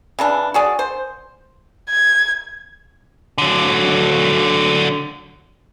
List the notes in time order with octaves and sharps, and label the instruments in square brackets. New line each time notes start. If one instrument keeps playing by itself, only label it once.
[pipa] C#3 E3 D4
F#4 G#4 D5
C5
[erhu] G#6
[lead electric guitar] D3 F#3